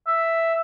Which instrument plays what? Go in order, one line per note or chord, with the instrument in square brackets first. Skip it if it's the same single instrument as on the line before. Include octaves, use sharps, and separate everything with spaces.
[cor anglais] E5